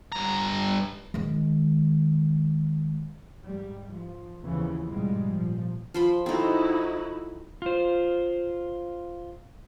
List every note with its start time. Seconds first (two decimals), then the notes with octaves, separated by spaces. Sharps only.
0.12 G2 A#5
1.14 D#3 G#3
3.44 G#2 G3
3.92 F3
4.42 D#2 C#3 E3 F3 B3
4.88 G#2 B2 F3 G3 G#3
5.28 A#2 F3
5.94 F3 C5 B5
6.26 C4 D#4 E4 F#4 A4
7.62 F4 C5